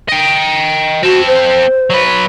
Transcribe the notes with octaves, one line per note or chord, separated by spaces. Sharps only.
D#5 G5
C4 F#4 A4
C5
F#3 B4